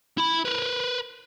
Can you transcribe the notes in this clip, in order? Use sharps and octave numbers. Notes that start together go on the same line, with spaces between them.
E4 B5
A#4 B4